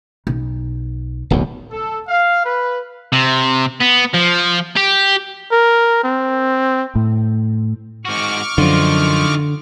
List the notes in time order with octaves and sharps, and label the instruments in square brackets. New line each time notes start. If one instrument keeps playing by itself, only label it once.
[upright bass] B1
[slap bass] D1 B1 E2
[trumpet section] A4
F5
B4
[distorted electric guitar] C3
B3
F3
G4
[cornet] A#4
C4
[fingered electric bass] A2
[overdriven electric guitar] G#2 F#4 [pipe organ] C#6 D6 F6
[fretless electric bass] F#2 F3 [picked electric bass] D3 [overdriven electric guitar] D#3 F4